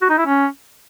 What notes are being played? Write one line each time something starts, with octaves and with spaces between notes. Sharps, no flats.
F#4
D#4
E4
C#4